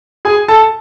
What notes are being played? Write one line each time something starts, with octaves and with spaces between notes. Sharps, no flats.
G#4 G#5
A4 A5